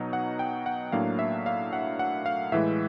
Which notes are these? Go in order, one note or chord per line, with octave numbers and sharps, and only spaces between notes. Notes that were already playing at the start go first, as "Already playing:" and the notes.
Already playing: B2 F#3 B3 D#4
F#5
G5
F#5
A2 F#3 A#3 D4 F5
E5
F5
F#5
F#5
F5
A2 E3 G#3 E5